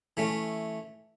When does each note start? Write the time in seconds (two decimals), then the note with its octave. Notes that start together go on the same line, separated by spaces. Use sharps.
0.17 E3 A3 C#4